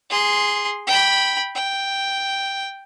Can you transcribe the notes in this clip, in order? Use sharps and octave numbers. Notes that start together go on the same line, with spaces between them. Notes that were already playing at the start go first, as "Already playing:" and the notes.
G#4 C6
G5 B5
G5